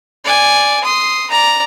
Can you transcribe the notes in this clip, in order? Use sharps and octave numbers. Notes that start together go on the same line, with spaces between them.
D5 G#5
C6 D#6
D5 A#5